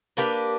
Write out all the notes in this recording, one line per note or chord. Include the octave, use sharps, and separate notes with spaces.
A#3 D4 G4 B4